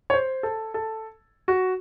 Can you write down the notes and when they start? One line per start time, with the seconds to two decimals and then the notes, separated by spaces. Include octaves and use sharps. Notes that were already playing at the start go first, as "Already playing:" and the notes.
0.10 C#5
0.14 C5
0.43 A4
0.74 A4
1.48 F#4